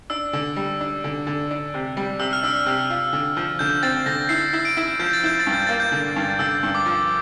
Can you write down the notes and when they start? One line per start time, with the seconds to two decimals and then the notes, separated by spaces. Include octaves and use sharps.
0.10 D4 E6
0.33 D3
0.56 G3
0.81 D4
1.04 D3
1.27 D3
1.51 D4
1.74 C3
1.97 G3
2.19 C3 E6
2.33 F6
2.43 D4 E6
2.66 C3
2.90 F4
3.13 D3
3.37 F3
3.59 D3 G6
3.83 C4 A6
4.06 D3 A#6
4.29 E4 C7
4.53 E4
4.65 D7
4.77 E4
4.99 F3 G6
5.13 A6
5.23 E4 G6
5.40 A6
5.47 G2
5.53 G6
5.67 A#3 A6
5.80 G6
5.92 D3
6.16 G2
6.39 D3 E6
6.63 G2
6.75 D6
6.86 F3